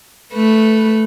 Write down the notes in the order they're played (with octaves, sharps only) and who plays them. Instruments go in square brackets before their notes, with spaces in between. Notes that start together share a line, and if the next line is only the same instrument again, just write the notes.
[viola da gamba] A3 B4